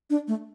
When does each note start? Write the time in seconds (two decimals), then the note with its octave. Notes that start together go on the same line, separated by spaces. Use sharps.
0.10 D4
0.28 A3